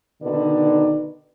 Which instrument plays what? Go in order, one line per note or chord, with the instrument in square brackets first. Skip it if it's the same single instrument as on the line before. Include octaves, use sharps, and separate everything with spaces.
[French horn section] B2 D3 D#3 D#4 B4 D5